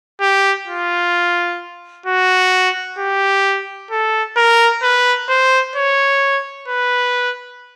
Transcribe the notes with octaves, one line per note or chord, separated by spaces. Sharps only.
G4
F4
F#4
G4
A4
A#4
B4
C5
C#5
B4